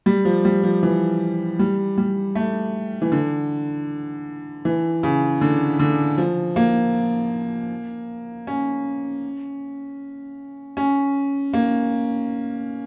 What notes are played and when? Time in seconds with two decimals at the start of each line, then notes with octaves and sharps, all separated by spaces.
0.06 G3
0.25 F3
0.45 G3
0.63 F3
0.83 E3
1.59 G3
1.98 G3
2.35 A3
3.02 E3
3.12 D3
4.65 E3
5.03 C#3
5.41 D3
5.79 D3
6.18 F3
6.56 A#3
8.47 C#4
10.77 C#4
11.53 A#3